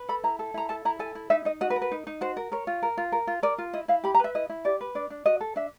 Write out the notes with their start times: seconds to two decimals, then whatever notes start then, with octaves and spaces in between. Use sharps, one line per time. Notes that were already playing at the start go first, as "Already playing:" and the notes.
Already playing: B4
0.09 A4 B5
0.23 E4 A#5
0.39 A4
0.54 E4 A#5
0.69 A4 A5
0.85 E4 A#5
0.99 A4 G#5
1.15 E4
1.30 D#4 E5
1.45 D#4 D#5
1.61 F#4 D#5
1.70 B4
1.76 A#4
1.82 B4
1.92 D#4
2.07 D#4
2.21 F#4 C5
2.37 A#4
2.52 A#4 C#5
2.67 F4
2.83 A#4
2.98 F4
3.12 A#4
3.27 F4
3.43 A#4 D5
3.58 F4
3.73 E4 D#5
3.88 E4 F5
4.04 G4 B5
4.15 A#5
4.19 B4 E5
4.35 E4 D#5
4.50 E4
4.65 G4 D5
4.81 B4
4.95 D4 D5
5.10 D4
5.26 F#4 D#5
5.41 A4
5.56 D4 E5